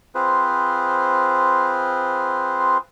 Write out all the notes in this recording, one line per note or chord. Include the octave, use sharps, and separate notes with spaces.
C4 F4 G#4 B4 C5